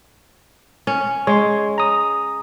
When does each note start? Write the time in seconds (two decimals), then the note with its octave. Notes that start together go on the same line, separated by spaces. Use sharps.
0.87 C#4
1.27 G#3 C#5 C6
1.78 A#5 D#6